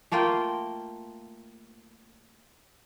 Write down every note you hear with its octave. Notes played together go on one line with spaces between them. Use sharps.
A3 A#3 F4 G5